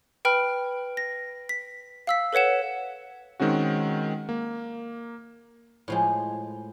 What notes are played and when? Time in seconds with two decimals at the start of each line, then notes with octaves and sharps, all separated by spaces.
0.25 B4 G5 B5 F6
0.97 A#6
1.49 B6
2.07 F5 E6 B6
2.33 A4 B4 C#5 F#5 E7
3.40 D#3 G#3 C4 C#4 F#4
4.29 A#3
5.88 A2 F3 G#3